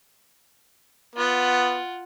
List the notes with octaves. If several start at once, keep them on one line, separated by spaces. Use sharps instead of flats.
B3 F4 F#5